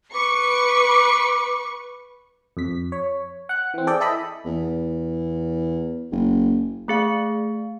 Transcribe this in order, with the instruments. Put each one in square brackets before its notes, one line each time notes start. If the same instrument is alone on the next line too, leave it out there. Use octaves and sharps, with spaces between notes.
[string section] B4 C#6 C#7 [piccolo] D6
[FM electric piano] F2 B6
C#5
F#5 F#6
E3 C4
G#4 A4 D5 G5
E4 A4 D#5 B5
[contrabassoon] E2
F#1
[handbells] A3 G#4 F5